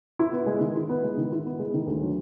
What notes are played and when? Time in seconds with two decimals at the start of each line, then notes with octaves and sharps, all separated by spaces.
0.19 E4
0.32 B3
0.46 G#3
0.61 D#3
0.76 E4
0.89 B3
1.04 G#3
1.17 D#3
1.32 E4
1.46 B3
1.59 G#3
1.74 D#3
1.87 D2
2.01 F#3